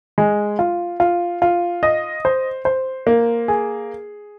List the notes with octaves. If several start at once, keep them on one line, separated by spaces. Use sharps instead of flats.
G#3
F4
F4
F4
D#5
C5
C5
A#3
G#4